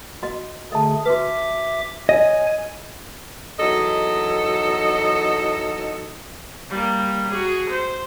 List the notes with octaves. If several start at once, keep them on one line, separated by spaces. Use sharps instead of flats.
F#4 D#5
D3 A3 G#4 D#5 A5
F#4 B4 E5 D6
C#5 D#5 G#5
E2 F#3 D#4 A4 D#5
G3 A#3
F#4 G#4
C5